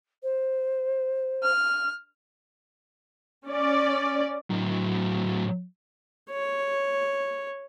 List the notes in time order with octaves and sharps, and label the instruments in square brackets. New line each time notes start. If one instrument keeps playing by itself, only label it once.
[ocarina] C5
[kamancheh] F6
[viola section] C#4 D5
[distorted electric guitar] A2 F#3
[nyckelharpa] C#5